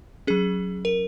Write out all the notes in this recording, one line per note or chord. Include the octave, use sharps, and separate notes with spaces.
F#3 C#4 G#4
A#4